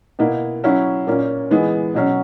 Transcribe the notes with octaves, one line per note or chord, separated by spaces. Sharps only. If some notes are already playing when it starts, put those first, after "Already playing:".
B2 A#3 E4
F#3 C#4 E4
A#2 A#3 C#4
E3 G#3 B3
B2 F#3 C#4